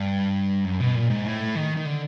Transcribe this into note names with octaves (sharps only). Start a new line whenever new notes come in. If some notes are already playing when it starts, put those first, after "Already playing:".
Already playing: G2
F#2
B2
A#2
G#2
A2
D#3
D#3
D3